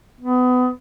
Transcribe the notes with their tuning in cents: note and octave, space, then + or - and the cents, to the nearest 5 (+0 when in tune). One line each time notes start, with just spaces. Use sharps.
B3 +25